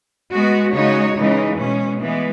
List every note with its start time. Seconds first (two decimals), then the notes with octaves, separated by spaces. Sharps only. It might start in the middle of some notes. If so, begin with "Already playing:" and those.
0.31 G#3 B3 F#4
0.74 C#3 G#3 D#4 F#4 C#5
1.15 C#3 E3 G#3 D#4
1.58 B2 G#3 C#4
2.01 E3 G#3 B3